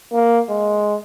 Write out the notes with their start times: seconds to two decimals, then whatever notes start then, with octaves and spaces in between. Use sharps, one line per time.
0.13 A#3
0.49 G#3